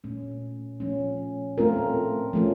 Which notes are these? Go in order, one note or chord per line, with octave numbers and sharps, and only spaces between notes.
A#2 A3 C#4
F3 A3 C#4
A3 C4 F4 A#4
F3 A3 C#4